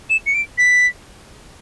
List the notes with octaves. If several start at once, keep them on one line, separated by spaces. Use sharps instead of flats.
E7
C#7
D7
B6